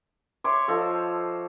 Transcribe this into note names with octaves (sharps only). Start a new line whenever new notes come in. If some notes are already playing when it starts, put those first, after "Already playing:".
C#5 E5 C6 D6
F3 A4 C5 D#5